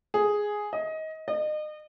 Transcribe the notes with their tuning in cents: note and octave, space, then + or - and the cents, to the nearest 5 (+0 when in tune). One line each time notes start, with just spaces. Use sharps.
G#4 +0
D#5 +20
D#5 -35